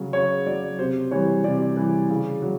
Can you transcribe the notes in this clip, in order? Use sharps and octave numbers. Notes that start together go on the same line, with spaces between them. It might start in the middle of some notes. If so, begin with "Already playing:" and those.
Already playing: C#3 F#3
C#3 C#5
F#3 D5
C3 C5
E3 G3 C#5
C3 D5
E3 G3
C#3
F#3